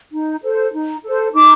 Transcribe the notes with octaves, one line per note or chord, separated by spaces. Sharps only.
D#4
A4 C5
D#4
A4 C5
D#4 D6